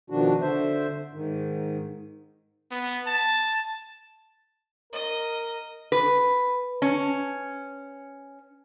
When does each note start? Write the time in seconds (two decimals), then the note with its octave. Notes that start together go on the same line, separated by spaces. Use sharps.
0.10 B2 D#3 F3 D4 F#4
0.41 D3 C5 E5
1.13 G#2 D#3
2.71 B3
3.07 A5
4.93 A#4 D#5
5.92 B4
6.82 C#4